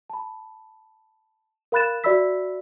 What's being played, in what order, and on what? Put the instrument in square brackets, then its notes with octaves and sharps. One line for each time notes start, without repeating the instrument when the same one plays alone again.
[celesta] A5 B5
A#4 F5 B5 F#6 A6 E7
F#4 D5 E5 B5 E6 B6